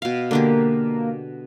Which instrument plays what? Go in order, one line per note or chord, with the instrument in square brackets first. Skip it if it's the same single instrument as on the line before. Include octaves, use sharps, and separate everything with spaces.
[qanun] B2 F5
[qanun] D3 D4 G4 [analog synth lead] A#3